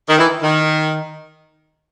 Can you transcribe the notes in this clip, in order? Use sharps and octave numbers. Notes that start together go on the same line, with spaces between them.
D#3
E3
D#3